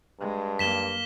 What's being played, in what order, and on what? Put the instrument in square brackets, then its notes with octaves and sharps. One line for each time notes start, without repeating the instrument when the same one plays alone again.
[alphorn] G2 [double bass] G#3
[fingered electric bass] F#2 [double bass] A#3 [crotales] B6 E7 G7